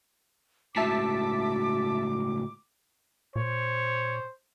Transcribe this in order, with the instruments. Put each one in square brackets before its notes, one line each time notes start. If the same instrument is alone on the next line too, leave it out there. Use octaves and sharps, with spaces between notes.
[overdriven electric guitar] C#2 A2 [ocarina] F#4 [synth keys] E5 A5 B6 [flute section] D6
[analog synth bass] A#2 [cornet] C5 [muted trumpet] C#5